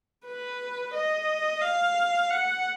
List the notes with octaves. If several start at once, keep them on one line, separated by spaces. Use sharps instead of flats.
B4
D#5
F5
F#5